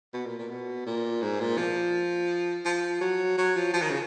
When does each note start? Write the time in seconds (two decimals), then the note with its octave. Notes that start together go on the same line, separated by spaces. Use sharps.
0.14 B2
0.26 A#2
0.39 A#2
0.50 B2
0.86 A#2
1.22 G#2
1.41 A#2
1.58 F3
2.65 F3
3.01 F#3
3.38 F#3
3.56 F3
3.74 F3
3.82 D#3
3.90 C#3